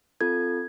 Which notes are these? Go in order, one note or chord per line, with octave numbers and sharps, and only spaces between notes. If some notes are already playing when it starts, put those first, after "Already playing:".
C4 F4 A4 G#6